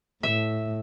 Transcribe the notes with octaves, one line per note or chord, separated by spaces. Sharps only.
A2 E5